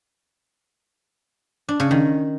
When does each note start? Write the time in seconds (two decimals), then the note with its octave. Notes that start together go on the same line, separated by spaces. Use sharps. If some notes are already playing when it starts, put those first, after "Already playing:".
1.69 D4
1.80 C#3
1.91 D#3